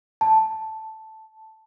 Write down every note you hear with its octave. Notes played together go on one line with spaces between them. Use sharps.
A5